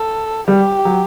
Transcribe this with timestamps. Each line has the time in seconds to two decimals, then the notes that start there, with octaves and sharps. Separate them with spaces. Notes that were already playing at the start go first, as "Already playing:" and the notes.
Already playing: A4
0.48 G3 G4
0.85 F#3